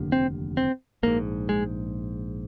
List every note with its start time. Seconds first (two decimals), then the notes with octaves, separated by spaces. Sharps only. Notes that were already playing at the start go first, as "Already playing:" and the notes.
Already playing: F1 D#2 D3
0.12 C4
0.57 C4
1.03 A#1 G#2 A#3
1.49 G#3